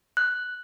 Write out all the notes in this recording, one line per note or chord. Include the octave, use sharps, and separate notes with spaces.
F#6